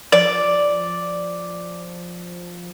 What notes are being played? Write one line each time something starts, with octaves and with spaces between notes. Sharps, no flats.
F3 D5